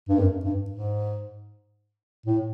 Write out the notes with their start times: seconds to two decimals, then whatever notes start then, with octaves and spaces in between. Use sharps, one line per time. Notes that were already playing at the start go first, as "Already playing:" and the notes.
0.08 G2
0.19 F#2
0.44 G2
0.70 G#2
2.26 A2